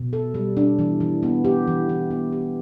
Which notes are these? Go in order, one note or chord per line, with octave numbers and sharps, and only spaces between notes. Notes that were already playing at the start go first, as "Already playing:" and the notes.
Already playing: B2
A4
G3
D4
E3
E3
B3
G4
E3
E3
B3
G4